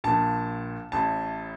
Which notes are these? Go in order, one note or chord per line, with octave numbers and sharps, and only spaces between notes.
A#1 A#2 A5
A1 A2 A5